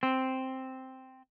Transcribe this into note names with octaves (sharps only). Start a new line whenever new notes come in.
C4